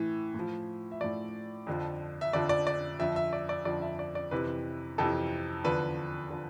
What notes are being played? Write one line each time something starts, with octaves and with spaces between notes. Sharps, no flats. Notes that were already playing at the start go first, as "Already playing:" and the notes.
Already playing: A2 E3
A2 F3
E5
A2 F3 D5
F2 D3 F3
E5
F2 D3 F3 D5
D5
D5
F2 D3 F3 E5
E5
D5
D5
F2 D3 F3 D5
E5
D5
D5
F2 C3 E3 B4
F2 C3 E3 A4
E2 D3 F3 B4
D3 F3